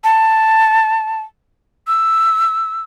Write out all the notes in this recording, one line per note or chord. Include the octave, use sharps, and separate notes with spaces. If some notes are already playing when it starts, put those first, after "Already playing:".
A5
E6